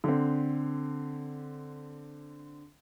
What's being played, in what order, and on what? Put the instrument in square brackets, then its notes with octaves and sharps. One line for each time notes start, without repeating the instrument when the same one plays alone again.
[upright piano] D3 C4